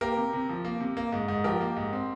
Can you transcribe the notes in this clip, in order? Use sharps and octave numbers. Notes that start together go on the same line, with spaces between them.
A#3 G4 A#4
C3
C3
F3
A#3
C3
A#3
G#2
G#2
F3 G4 A#4
A#3
G#2
C4